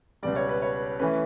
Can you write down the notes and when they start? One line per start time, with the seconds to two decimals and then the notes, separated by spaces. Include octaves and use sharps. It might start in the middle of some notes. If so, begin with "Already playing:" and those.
0.23 C#2 B2 G3 D5
0.36 C#5
0.49 B4
0.62 C#5
0.99 E3 A3 C#4 B4